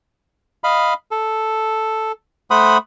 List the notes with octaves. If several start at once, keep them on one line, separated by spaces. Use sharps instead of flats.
D#5 F5 B5
A4
A3 C5 F#5 B5 D#6